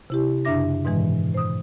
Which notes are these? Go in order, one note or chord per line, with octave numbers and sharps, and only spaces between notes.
C3 E4 G4
F#2 C#3 D4 E5 D6 A#6
G#2 B2 D#3 E3 G#3
C5 D#6